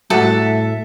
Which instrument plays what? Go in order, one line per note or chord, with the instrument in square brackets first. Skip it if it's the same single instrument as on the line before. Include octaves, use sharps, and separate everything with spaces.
[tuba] A2 [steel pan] G3 F#4 F#5 [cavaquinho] A4 [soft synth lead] E5